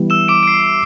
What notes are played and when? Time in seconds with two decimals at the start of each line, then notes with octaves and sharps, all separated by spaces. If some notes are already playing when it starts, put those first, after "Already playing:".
Already playing: E3 G3 B3 E4
0.10 E6 E7
0.28 D6 D7
0.43 D7
0.47 C7